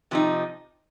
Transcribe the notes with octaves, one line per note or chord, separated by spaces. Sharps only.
C3 F3 C4 D#4